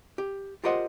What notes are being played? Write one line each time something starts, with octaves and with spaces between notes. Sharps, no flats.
G4
F4 G4 A#4 C5 D#5 F#5